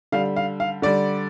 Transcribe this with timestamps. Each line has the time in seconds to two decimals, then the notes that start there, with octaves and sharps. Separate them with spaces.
0.12 D3 G3 F5
0.36 F5
0.60 F5
0.82 D3 G3 D5